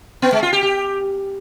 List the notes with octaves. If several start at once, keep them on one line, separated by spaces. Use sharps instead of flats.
B3
G#3
F4
G4
G4